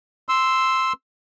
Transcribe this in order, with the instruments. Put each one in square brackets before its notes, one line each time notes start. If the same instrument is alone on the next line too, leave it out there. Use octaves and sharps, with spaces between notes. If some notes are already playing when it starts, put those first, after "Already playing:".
[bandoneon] C6 E6